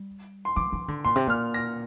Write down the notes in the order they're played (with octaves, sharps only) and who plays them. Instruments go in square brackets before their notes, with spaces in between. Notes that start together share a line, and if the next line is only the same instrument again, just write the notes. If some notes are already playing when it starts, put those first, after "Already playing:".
Already playing: [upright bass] G3
[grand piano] C6
[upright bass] F3 [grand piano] D6
[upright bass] F3
D3
[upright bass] A#2 [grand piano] C6
[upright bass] C3
[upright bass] A#2 [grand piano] F6
[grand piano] A#6